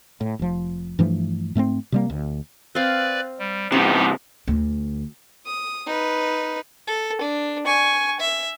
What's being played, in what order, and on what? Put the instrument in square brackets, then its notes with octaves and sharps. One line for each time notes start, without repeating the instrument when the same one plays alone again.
[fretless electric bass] A2
F1 F3
G2 E3 F3 A3
G#2 A3 B3 C4
C3 G3 A#3
D2
[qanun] C4 F5 [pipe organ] B4 D5
[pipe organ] G3
[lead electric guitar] C3 E3 [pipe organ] B3 D#4 G4 [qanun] A5
[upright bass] D2
[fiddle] D#6
D#4 B4
[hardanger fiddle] A4
D4
G#5 C#6
E5